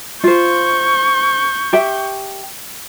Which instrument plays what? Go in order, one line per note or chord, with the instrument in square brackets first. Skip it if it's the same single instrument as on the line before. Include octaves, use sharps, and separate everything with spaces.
[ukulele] F4 C5 [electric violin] C#6 G6
[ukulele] G4 E5 G5